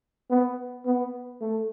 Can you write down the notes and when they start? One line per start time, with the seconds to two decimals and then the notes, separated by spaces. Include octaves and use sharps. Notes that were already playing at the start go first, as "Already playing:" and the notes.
0.30 B3
0.85 B3
1.41 A3